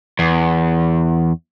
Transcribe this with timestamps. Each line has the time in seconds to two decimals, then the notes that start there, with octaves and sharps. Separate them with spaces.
0.19 E2